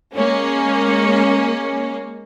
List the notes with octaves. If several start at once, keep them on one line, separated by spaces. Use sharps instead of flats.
G#3 A#3 C#4